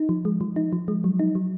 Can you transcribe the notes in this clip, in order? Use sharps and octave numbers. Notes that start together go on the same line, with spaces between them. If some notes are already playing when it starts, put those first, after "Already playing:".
Already playing: D#4
F3
G#3
F3
D#4
F3
G#3
F#3
D#4
F#3